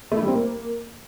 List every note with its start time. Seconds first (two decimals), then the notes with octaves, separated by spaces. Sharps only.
0.12 A3
0.17 E4
0.22 G3
0.28 C4
0.33 A#3